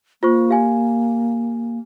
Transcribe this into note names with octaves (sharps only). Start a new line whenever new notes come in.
A#3 F4 C5 C#6
G4 F5 G#5